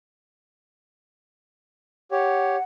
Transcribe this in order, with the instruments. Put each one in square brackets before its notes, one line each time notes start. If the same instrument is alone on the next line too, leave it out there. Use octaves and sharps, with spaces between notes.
[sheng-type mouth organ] G4 C#5 [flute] F#5